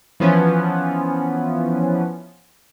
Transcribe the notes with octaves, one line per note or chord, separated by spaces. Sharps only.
E3 F3 B3 C#4